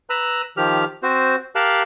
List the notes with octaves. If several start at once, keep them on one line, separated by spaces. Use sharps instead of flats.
B4 A#5 B5 E6
D#3 F3 G4 F6
C4 F#4 C5
G4 A#4 F5 A5 F#6